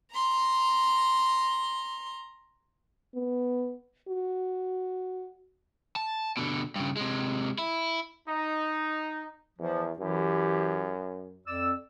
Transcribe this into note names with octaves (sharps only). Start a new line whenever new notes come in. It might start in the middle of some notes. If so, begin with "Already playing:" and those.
A#5 C6
B3
F#4
A5
B2 D3
G2 C#3
C3 G#3
E4
D#4
E2 F3
F#2 E3 E4 G4
F2 D5 E6